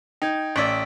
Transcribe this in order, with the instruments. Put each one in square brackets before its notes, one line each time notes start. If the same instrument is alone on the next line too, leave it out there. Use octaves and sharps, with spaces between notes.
[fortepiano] D#4 [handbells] G5 G#6
[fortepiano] A1 D5 [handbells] E6 B6 D7